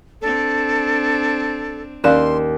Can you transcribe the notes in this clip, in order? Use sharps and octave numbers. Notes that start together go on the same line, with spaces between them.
C4 D4 A4
D#2 C#4 D5 F5 C6 F#6 E7